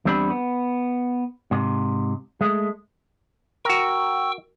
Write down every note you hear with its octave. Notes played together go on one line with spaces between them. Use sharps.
E2 G3 C4 D4 G4 B5
B3
G#2 C3
G#3 A3
F#4 A#4 G5 C#6 E6